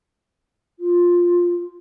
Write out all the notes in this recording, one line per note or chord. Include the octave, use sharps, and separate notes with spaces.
F4